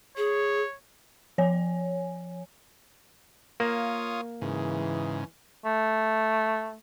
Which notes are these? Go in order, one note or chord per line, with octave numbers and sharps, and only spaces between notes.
G#4 C#5
F3 C#5 G#5
A#3 F4 C#5 D#6
G#2 C#3 E3
A3